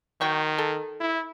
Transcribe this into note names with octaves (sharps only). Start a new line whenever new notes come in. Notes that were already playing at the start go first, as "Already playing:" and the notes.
D#3 F#3 G5 C#6
A4
E4